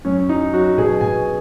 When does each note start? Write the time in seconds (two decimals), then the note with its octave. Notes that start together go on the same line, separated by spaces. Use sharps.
0.05 F#2 C#4
0.29 F#3 D#4
0.53 F#3 F#4
0.78 B2 G#4
1.01 B2 G#5